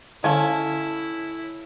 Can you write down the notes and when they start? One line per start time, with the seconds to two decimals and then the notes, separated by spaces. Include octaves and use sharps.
0.24 D3 C#4 E4 A4 F5 G#5 A5